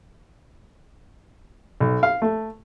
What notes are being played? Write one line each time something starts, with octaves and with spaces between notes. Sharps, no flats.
B1
F5
A3